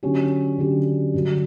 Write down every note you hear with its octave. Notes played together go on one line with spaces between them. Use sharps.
D3 F#3 C#4 G4
D3 F#3 C#4 G4
G2 D3 F#3